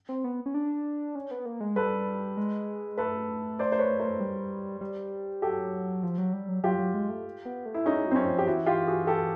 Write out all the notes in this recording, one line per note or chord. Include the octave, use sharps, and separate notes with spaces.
C4
B3
C#4
D4
C#4
B3
A#3
G#3
G3 A4 B4
G#3
A3 A4 B4
C5 D5
C5
B4 C#5
A#4 C5
G3
G3
F#3 G4 A4
F3
F#3
G3
F#3
F#3 F4 G4
F#3
G#3
A3
B3
A3
E4
G#3 C#4 D#4
F#3 C4
C#4
F3
G4
E3 E4 F#4
F4 G4
F#4 G#4
G4 A4